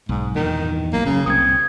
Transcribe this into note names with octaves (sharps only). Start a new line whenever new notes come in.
B1 G#2
E2 G2 A#2 D#3
B1 B2 F#3 A#3
F#1 C#3
C2 A#2 C4 D#6 G#6